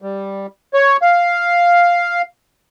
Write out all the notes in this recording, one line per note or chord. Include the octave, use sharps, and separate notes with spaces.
G3
C#5
F5